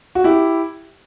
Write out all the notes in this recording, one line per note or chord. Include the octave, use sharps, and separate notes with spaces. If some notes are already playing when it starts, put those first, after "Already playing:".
F#4
E4 G4